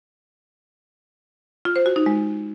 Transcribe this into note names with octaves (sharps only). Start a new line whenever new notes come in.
F4
C5
F#4
D#4
G#3